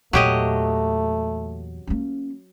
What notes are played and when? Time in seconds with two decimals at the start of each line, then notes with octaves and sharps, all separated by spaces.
0.13 E2 A#2 F#3 A3 G4 D#5
1.87 A#3 C#4